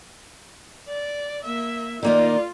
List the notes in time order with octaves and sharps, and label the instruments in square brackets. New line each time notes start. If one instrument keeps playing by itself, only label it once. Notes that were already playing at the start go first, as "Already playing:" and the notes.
[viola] D5
A#3 E5
[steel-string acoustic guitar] D#3 A#3 D#4 [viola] F4 [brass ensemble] D5